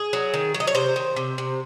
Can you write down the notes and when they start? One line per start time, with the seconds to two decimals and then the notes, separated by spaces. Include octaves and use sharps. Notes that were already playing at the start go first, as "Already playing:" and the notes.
Already playing: G#4
0.13 F#3
0.34 D#3
0.54 F#3
0.60 D#5
0.67 C#5
0.75 C3 C5
0.96 D#3
1.16 C3
1.38 C3